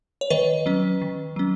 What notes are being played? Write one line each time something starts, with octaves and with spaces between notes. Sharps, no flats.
C#5
D#3 B4 D#5
F#3 C#4
D#3
F#3 C#4